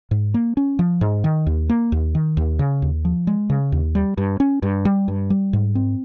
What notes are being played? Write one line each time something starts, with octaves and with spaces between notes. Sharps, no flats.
G#2
A#3
C#4
F3
G#2
D#3
D#2
A#3
D#2
D#3
D#2
C#3
D#2
F3
G#3
C#3
D#2
G3
G2
C#4
G2
G3
G2
G3
G#2
C4